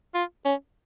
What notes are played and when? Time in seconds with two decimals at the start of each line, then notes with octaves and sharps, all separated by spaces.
0.15 F4
0.45 C#4